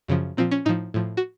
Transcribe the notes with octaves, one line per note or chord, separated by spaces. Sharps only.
F#2 C#3 F3
A#2 F3 C4
C#4
A2 F3 D#4
A2 F3
F#4